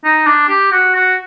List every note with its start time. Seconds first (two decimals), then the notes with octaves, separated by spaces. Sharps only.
0.04 D#4
0.27 D4
0.49 G4
0.71 F#4
0.95 F#4